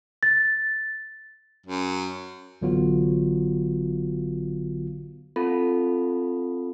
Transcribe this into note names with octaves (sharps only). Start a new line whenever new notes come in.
A6
F#2
A1 D3 F#3 B3 F4 F#4
C4 F4 A4 B5